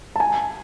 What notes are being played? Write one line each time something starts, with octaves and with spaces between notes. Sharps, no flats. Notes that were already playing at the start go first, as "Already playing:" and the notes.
A5
G#5